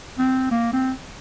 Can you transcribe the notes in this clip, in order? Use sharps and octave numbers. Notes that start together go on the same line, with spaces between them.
C4
A#3
C4